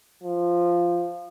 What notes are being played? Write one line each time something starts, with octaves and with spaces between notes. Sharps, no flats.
F3